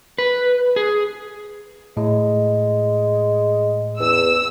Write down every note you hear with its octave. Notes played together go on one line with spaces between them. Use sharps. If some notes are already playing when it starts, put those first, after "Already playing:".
B4
G#4
A2 G#3
E2 E6